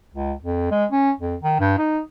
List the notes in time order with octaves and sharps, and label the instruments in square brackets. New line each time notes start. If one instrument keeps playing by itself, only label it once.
[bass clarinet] C#2
F2
G#3
C#4
F2
D#3
G2
D#4